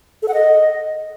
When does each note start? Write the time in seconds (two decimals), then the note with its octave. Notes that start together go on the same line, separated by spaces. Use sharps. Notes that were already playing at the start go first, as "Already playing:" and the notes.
0.22 A4
0.28 F#5
0.34 D#5